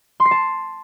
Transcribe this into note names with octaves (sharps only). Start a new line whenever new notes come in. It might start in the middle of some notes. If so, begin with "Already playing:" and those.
C6
C7
A5